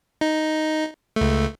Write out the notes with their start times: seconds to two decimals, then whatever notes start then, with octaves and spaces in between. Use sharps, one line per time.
0.21 D#4
1.16 C#2 A3